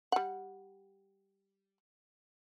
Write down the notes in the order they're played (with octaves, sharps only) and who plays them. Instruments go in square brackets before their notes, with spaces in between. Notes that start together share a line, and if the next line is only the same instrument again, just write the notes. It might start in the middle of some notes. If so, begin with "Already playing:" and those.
[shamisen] G3 F#5